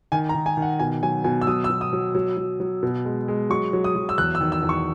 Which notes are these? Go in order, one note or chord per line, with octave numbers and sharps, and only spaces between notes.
D#3 G#5
A#5
D#3
G#5
D#3
F#5
B2 G#5
F#3 G#5
B2 G#5
E6
F#3 D#6
E6
B2
D#6
F#3
F#3
F#3
F#3
B2
G#3
G#3
F#3 C#6
F#3
D#6
F#3
E6
E2 F#6
E6
D#3
E6
E2
C#6